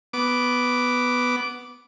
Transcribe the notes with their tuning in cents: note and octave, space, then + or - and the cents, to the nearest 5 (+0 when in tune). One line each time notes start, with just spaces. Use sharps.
B3 +0 D6 -10